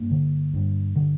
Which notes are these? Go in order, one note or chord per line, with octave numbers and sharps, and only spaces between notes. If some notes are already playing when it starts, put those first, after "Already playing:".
Already playing: G2 A#3
D3
G2
D3